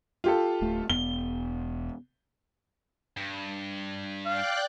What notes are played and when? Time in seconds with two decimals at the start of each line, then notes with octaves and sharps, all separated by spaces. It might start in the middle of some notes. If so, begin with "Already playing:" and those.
0.24 F4 G4 A4
0.61 D1 A3
0.90 E1 B3 G7
3.17 G2
4.26 D5 F5 G5 F#6